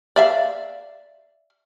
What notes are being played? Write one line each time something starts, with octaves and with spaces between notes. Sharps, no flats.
D5 E5 F5